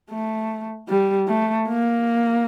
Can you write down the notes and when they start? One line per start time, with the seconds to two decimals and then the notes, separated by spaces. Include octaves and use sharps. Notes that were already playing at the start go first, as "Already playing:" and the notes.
0.11 A3
0.89 G3
1.28 A3
1.68 A#3